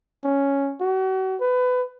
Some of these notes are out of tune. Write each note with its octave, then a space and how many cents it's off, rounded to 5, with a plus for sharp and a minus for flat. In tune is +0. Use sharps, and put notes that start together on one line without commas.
C#4 +0
F#4 +35
B4 +25